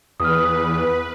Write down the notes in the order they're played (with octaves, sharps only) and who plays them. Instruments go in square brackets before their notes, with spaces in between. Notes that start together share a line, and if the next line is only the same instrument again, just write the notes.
[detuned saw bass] E2 [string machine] B4 [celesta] D#6 F6